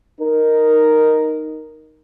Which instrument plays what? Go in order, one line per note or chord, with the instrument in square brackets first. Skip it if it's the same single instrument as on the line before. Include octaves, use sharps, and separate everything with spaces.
[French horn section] D#4 A#4